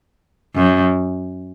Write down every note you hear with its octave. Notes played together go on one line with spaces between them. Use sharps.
F#2